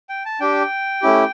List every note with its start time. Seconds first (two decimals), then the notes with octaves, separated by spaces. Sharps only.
0.09 G5
0.25 A5
0.40 D4 G4 G5
1.02 A3 C#4 E4 G4